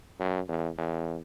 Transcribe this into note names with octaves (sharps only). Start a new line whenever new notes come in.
F#2
E2
E2